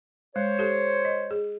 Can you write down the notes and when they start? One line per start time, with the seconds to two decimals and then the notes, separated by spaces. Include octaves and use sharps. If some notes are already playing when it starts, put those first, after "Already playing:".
0.36 G#3 C5 C#5
0.59 G4 A4
1.05 D#5
1.31 G#4